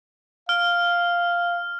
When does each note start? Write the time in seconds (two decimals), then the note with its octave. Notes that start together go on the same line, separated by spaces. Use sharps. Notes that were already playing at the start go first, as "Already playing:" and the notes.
0.49 F5 F6